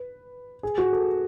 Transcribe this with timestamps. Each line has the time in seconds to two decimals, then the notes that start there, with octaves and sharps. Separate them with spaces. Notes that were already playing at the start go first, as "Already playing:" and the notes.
Already playing: B4
0.63 G#4
0.78 F#4
0.93 A4